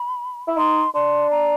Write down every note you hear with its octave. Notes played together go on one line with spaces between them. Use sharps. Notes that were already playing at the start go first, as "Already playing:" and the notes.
Already playing: B5
E4
D#4 C6
D4 C6
A#5